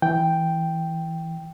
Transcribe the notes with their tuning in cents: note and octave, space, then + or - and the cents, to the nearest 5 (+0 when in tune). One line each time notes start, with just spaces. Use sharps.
E3 -5 G5 +0